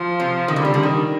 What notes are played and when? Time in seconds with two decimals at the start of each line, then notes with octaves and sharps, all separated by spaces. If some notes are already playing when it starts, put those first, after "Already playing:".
Already playing: F3
0.20 C3
0.48 D#3
0.55 D3 G3
0.65 C3
0.74 D3
0.83 D#3